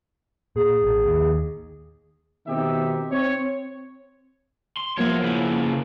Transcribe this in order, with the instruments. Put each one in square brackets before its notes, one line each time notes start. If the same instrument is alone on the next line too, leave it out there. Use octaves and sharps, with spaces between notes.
[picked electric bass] A#2 [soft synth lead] G#4
[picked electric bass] A1
D#2
[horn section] B2 D#3 C4 D#4 G4 E5
C4 C#5
[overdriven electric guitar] C6
[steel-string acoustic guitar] F3 A#3 B3 [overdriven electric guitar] C#5 E5
[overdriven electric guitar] C#3 E4